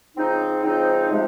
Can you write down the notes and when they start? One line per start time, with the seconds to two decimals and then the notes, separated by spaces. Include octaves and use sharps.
0.16 C#3 F3 G#3 C4 D#4
0.62 C#3 F3 G#3 C4 D#4
1.09 C3 F3 G#3